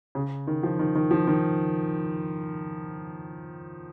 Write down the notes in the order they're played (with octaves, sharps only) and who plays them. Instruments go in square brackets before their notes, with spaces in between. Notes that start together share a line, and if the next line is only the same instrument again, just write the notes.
[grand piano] C#3
D#3
F3
D#3
D#3
F3
D#3